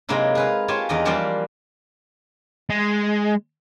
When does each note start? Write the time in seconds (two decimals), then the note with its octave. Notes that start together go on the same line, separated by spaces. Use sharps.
0.09 C3 F#3 G#3 A#3 D#4 E4
0.35 G#4 B4 F5
0.68 F4 G4 C#5 G#5 A5
0.89 E2 D#4 D5 D#5 A#5
1.05 E3 F3 G3 A#3 G4 D5
2.70 G#3